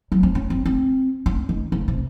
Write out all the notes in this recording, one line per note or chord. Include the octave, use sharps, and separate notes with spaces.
F#3
C4
C#4
C4
C4
C#4
D#3
C#3
C3